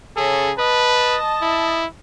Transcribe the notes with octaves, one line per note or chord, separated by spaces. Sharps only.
C#3 G#4 A4
B4 D#5 A5
E4